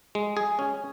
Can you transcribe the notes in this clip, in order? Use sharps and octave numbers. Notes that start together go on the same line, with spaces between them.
G#3
G#4
C#4